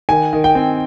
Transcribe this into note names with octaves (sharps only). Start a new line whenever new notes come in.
D#3 G#5
D#3
G5
C4